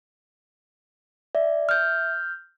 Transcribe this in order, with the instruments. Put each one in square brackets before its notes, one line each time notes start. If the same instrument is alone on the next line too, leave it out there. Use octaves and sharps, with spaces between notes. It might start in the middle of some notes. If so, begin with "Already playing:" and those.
[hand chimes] D5 [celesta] E5
[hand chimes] F6 G6